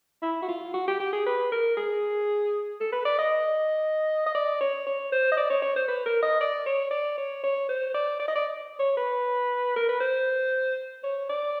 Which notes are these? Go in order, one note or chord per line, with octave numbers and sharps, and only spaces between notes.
E4
F#4
F4
F#4
G4
G4
G#4
B4
A#4
G#4
A4
B4
D5
D#5
D#5
D5
C#5
C#5
C5
D#5
D5
C#5
C#5
C5
B4
A#4
D#5
D5
C#5
D5
C#5
C#5
C5
D5
D5
D#5
D5
C#5
B4
A#4
B4
C5
C#5
D5